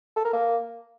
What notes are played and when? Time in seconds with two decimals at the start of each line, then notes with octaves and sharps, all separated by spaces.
0.17 A4
0.25 A#4
0.33 A#3